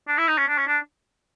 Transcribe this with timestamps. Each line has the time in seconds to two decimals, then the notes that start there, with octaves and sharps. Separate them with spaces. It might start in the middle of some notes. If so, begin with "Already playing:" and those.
0.08 D4
0.18 E4
0.27 D#4
0.38 C#4
0.48 D4
0.58 C#4
0.67 D4